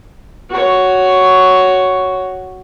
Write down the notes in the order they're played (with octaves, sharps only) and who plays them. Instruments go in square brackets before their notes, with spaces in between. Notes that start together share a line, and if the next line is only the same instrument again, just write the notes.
[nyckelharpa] F#4 C#5